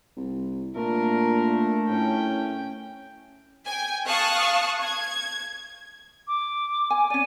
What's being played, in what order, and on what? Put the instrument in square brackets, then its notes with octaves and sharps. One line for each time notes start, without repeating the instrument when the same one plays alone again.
[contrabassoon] C2
[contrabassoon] A#2 [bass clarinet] A3 [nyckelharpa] D4 A#4
[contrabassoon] A2 [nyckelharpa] C#4 G5
[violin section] G5 G#5
F5 A5 C#6 D#6 F#6
G#6
[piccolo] D6
[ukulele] G#5
[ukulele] C#4 D5 [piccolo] D#7